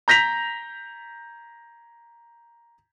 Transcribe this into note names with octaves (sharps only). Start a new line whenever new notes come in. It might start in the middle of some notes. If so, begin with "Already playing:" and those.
A#5 G6 A#6 B6 F7